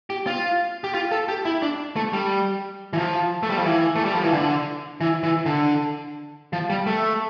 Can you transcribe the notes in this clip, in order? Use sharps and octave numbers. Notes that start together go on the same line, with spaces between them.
G4
F4
G4
F4
A4
G4
E4
D4
A3
G3
E3
F3
A3
G3
F3
E3
A3
G3
F3
E3
D3
E3
E3
D3
F3
G3
A3